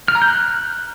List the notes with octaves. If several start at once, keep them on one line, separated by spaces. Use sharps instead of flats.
F6
A#5
G6
F#6